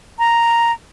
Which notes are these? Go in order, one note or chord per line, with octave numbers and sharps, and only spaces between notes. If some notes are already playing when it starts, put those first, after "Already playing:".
A#5